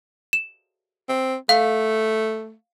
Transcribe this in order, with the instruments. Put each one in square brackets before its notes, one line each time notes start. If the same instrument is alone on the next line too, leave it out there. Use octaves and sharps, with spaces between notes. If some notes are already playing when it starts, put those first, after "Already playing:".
[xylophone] E7
[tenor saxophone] C4
[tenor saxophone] A3 [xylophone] F5